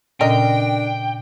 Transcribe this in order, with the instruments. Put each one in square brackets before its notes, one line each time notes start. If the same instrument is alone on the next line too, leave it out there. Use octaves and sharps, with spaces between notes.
[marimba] A#2 C#3 C#4 [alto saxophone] D4 [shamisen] A#4 D#5 [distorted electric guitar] G5